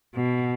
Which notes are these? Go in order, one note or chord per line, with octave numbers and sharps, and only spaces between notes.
B2